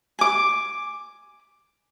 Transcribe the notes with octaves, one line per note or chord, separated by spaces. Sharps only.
G#5 D6